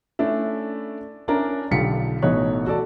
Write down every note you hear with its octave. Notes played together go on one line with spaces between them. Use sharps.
A3 C#4 D4 E4
C#4 D4 E4 A#4
B1 D3 F4 G4 B6 C#7
A1 B2 A3 D#4 C#5 F#6
F#4 A4 D5 A5